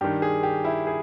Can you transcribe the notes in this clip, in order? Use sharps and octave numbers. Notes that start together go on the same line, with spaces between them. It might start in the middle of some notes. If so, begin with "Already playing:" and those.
G2 D#3 G4
G#4
G4
E4
G#4